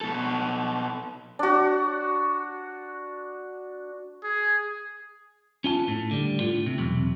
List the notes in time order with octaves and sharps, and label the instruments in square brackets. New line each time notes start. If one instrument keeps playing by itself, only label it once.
[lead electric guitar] B2 A4
[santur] D4 F#4
[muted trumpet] G#4
[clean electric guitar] C#4 F4 G#5 A5
A2
D3 G3
A2 F4
C3
B1 E2 C3